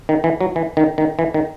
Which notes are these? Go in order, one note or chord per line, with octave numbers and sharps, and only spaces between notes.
D#3
E3
F#3
E3
D#3
D#3
E3
D#3